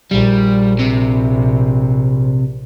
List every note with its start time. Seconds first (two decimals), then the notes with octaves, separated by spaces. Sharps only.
0.11 A#1 G3
0.79 C3